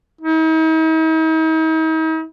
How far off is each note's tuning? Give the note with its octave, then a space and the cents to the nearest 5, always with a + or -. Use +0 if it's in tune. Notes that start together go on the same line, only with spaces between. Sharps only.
D#4 +45